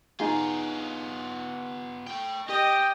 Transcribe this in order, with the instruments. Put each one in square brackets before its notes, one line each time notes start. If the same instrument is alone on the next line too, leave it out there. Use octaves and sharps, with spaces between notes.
[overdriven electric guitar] B3 F4 [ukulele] D#4 G#4
[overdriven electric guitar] A3 G5
[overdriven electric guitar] G4 [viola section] D#5 [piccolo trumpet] G5